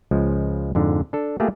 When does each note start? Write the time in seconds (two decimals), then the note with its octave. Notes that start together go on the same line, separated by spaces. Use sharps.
0.11 C#2 F3 G#3
0.75 F2 G#2 D3
1.13 D4 A4
1.40 A3 A#3 F4 G4 G#4